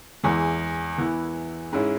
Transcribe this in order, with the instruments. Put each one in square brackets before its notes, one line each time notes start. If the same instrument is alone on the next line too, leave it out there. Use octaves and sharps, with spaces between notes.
[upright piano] E2 E3 G#3
E3 B3 E4
G#2 G#3 C#4 E4